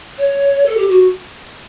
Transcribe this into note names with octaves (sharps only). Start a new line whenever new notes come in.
C#5
A4
G4
F#4